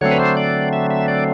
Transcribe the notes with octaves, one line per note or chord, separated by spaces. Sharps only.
D3 F#3 A3 C4 C#5
B4
C5
D5
E5
E5
D5